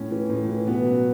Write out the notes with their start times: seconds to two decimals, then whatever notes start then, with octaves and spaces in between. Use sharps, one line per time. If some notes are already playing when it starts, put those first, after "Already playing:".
Already playing: A2 C#4
0.11 E3
0.30 A2
0.48 E3
0.67 B2 B3
0.86 F#3 F#4